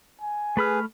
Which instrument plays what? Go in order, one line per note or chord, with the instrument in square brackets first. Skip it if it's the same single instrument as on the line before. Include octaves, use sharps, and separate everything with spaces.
[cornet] G#5
[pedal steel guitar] A3 B5 F6 [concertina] G#4 B4